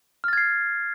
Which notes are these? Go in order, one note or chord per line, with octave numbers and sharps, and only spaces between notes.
F6 G#6 A6 C7